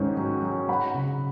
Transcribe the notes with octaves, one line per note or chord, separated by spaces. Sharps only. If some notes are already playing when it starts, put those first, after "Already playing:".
Already playing: G#2 D#3 C#4
F#3
F#3
F#3 F#5 B5
C#3